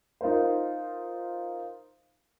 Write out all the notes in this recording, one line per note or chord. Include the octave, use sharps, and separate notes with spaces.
D#4 F4 A#4 C5